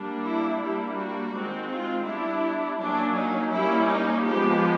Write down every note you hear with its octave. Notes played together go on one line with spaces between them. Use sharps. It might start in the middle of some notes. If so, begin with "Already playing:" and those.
Already playing: G3 A#3 D4
E4
G3 A#3 D4 E4
F#4
D#3 G#3 C4
F4
G3 B3 D4 E4
F#3 A#3 C#4 D4
D#4
G3 A#3 C#4 E4
D#4
F3 G#3 B3 G4